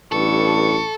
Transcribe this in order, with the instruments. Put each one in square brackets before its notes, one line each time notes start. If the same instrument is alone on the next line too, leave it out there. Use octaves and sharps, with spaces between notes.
[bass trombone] A1 [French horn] G2 [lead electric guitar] A4 [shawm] C#6